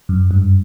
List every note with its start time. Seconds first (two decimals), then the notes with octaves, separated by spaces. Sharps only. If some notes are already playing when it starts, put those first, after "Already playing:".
0.09 F#2
0.31 G2